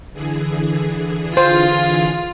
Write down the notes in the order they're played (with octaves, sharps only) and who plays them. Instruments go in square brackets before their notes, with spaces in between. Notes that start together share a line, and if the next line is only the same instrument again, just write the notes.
[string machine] D3 E3 G#4
[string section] F4 [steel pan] C5